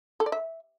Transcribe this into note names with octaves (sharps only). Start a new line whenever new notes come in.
A4
D5
E5